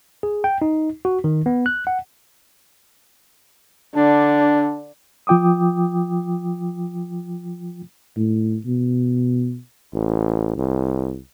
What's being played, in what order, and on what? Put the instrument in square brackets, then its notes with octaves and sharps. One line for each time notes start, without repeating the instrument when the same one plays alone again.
[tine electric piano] G#4
G5
D#4
F#4
D#3
B3
F#6
F#5
[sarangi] D3 [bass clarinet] D4
[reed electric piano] F3 F4 G5 D6 D#6
[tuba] A2
B2
[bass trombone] A1
C2